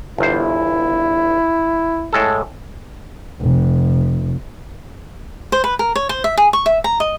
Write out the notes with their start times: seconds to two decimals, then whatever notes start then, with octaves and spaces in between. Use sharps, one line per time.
0.18 G1 E2 E4 C5
2.13 A2 G#3 A4
3.41 F1
5.52 C5
5.64 B4
5.79 A#4
5.96 C#5
6.09 C5
6.24 E5
6.37 G#4
6.53 C#6
6.66 E5
6.84 A#5
7.00 D#5